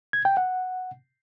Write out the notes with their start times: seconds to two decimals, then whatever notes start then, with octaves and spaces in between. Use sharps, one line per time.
0.13 G#6
0.25 G5
0.37 F#5